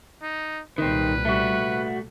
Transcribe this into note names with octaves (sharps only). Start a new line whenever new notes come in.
D#4
C2 A#2 D#3 G3 C4 B4
A3 F#4